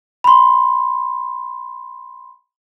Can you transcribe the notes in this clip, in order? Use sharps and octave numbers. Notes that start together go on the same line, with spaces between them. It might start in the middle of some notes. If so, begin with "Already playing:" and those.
B5 C6